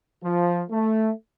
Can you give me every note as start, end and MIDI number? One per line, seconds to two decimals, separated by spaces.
0.23 0.61 53
0.70 1.10 57